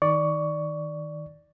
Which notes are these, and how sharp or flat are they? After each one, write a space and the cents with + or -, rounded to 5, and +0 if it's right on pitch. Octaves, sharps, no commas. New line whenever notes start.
D#3 +10 D5 +0 C#6 +15